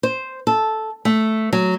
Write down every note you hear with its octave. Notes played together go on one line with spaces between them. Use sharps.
C5
A4
A3
F#3